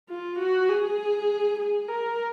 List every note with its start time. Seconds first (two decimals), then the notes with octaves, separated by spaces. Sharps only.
0.09 F4
0.39 F#4
0.69 G#4
1.59 G#4
1.88 A#4